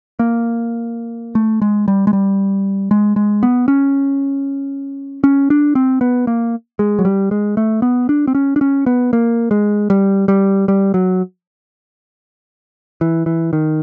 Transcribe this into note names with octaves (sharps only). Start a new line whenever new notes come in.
A#3
A3
G#3
G3
G#3
G3
G#3
G#3
B3
C#4
C#4
D4
C4
B3
A#3
G#3
F#3
G3
G#3
A3
B3
D4
C4
C#4
D4
C#4
B3
A#3
G#3
G3
G3
G3
F#3
E3
E3
D#3